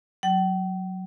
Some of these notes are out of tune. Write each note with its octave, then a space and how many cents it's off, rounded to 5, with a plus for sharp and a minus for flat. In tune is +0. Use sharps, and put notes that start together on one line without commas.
F#3 +0 G5 -40